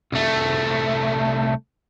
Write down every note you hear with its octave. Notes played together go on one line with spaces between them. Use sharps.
C2 A3